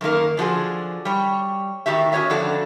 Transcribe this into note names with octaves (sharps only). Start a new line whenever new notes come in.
F#2 D#3 A#3 A#4
D3 F3 F#4 G#4
G3 C#5
A2 D#3 F#4 G4 E5
C#4 F#4 C5 C#5 D#5 E5
F2 D3 D4 F#4 A4